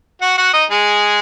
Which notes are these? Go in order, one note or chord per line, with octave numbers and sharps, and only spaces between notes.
F#4 F#5
F#4 F#5
D#4 D#5
G#3 G#4